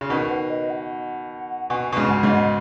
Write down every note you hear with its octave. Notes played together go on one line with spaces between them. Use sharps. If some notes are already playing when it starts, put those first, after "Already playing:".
C#3
B2 D#3 F#5
B4
D#5
F#5
B2 G#5
B2
G#2 C#3
F#5
G#2 C#3
D#5